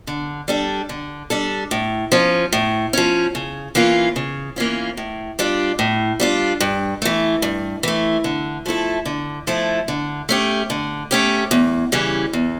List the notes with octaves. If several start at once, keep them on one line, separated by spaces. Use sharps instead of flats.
D3
G3 D4 A4
D3
G3 D4 A4
A2
F3 C#4
A2
F3 C#4
C#3
E3 A#3 C#4 F4
C#3
E3 A#3 C#4 F4
A2
G3 D4 F4
A2
G3 D4 F4
G2
E3 A3
G2
E3 A3
D3
F3 A3 E4 A4
D3
F3 A3 E4 A4
D3
A3 C#4 G4
D3
A3 C#4 G4
E2
C#3 E3 G3 C#4
E2